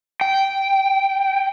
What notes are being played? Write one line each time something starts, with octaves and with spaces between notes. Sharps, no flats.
G5